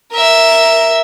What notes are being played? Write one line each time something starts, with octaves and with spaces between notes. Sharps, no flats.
A#4 E5